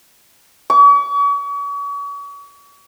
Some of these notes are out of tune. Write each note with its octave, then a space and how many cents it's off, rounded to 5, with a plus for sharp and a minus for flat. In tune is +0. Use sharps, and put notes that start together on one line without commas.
C#6 +40